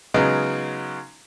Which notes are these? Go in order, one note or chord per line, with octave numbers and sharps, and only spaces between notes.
C#3 F#3 G#3 B3 D#4